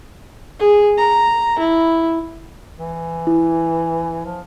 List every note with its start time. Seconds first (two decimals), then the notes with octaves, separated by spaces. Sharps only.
0.60 G#4
0.98 A#5
1.59 E4
2.78 E3
3.27 E4
4.26 F3